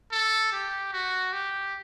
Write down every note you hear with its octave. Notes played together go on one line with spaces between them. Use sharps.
A4
G4
F#4
G4